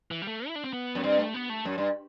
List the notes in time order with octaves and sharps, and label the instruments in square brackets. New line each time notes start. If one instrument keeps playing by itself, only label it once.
[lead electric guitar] E3
G3
A3
E4
D4
C4
B3
[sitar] F#2
[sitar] G2 [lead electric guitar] C4
[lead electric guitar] A3
B3
A3
[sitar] F#2
G2